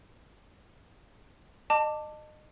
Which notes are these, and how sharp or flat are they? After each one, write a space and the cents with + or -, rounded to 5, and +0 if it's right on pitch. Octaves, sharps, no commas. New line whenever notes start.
D#5 -30 A5 +15 D6 +0